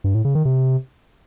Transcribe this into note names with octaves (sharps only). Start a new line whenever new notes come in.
G2
A2
C#3
D#3
C3